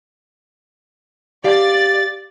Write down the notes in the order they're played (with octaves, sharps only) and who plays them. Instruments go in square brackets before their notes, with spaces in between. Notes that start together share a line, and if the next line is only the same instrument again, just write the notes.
[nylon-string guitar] G4 F5 [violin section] D5 A6